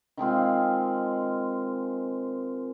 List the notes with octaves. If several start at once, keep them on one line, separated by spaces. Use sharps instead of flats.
D#3 G#3 C4 F4